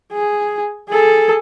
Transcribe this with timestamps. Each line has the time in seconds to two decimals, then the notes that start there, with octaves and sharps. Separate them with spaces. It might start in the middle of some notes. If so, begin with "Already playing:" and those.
0.13 G#4
0.90 G#4 A4